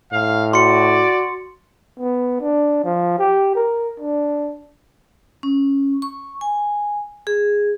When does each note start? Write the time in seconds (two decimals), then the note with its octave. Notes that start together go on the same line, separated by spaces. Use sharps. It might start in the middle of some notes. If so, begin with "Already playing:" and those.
0.12 A2 F5
0.53 F#4 D5 C6 C#7
1.99 B3
2.41 D4
2.84 F3
3.19 G4
3.55 A#4
4.00 D4
5.43 C#4
6.02 C#6
6.41 G#5
7.27 G#4